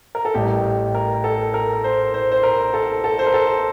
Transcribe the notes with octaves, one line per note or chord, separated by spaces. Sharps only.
A#4
A4
A1 A2 G3 G4
A#4
A4
A#4
C5
C5
C5
A#4
A4
A4
C5
A#4
A4